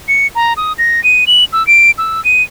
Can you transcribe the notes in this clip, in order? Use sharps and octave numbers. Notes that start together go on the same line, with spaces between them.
C#7
A#5
D#6
A#6
D#7
F#7
E6
D7
E6
D#7